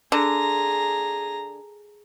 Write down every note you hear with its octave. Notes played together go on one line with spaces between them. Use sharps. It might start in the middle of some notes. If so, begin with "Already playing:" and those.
D3 G#4 A#5